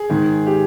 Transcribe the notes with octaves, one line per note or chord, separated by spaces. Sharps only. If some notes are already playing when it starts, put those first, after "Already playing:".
Already playing: G#4
G#2 D#3
G4